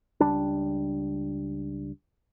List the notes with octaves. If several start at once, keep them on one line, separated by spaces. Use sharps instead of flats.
C#2 G3 D4